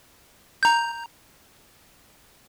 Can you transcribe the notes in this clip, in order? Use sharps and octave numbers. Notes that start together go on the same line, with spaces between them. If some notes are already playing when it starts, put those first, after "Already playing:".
A#5 G6